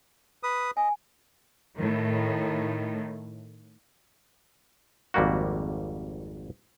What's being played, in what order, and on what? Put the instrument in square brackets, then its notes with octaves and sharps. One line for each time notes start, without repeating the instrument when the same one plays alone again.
[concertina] B4 D#6
[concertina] D#5 [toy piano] G#5
[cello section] A2 D#3
[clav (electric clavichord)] G#1 F2 G3 A#3 F#4